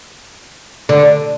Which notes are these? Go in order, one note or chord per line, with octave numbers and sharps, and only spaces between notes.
D3